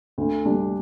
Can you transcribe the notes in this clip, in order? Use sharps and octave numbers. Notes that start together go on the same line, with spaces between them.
D2
D3 G3 D4